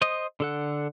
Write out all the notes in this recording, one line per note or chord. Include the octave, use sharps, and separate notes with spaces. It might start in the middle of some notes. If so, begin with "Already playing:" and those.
C5 D#5 D#6
D3 A4 F#5